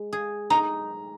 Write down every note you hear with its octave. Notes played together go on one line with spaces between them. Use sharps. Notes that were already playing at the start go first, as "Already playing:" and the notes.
Already playing: G#3
G#4
D#4 A#5